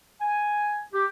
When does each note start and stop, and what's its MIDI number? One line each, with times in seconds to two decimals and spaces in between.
0.20 0.81 80
0.93 1.05 67